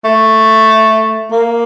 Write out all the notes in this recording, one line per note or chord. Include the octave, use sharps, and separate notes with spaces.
A3
A#3